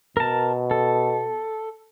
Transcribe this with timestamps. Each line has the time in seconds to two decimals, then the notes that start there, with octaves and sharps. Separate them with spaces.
0.17 B2 A#4 A5
0.71 A4